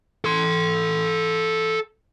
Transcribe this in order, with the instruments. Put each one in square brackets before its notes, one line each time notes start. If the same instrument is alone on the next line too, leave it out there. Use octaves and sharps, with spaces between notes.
[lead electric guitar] A4 C6